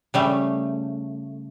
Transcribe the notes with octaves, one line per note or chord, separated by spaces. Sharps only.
C#3 G3 A3